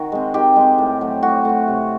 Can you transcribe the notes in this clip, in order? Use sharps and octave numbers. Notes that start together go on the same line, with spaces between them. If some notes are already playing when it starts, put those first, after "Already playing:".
Already playing: D#3 F#4
G#3 C4
D#3 G4
G#3 C4
A2
F#3 A3
A2 F#4
F#3 A3
C3